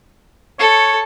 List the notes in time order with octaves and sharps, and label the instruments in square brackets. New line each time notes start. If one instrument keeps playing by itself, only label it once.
[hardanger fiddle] A4 [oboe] C#5